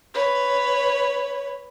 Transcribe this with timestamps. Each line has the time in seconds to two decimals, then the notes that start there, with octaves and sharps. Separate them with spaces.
0.14 B4 C#5